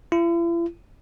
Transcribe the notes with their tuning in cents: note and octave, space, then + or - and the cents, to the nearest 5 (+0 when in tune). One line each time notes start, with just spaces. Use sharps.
E4 +45